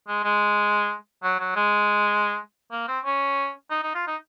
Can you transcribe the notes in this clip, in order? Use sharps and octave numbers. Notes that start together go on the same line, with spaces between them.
G#3
G#3
F#3
F#3
G#3
A#3
C4
C#4
D#4
D#4
F4
D#4